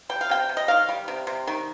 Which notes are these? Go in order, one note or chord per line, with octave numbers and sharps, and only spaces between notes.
G3 G5
F5
C3 G5
C3
D#5
D#3 F5
G3
C3
C3
D#3